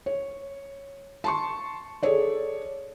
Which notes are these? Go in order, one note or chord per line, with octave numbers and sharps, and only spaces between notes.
C#5
A5 C6 C#6
G#4 A4 C#5 D5